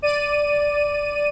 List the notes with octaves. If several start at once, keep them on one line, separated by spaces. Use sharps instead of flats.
D5 D#7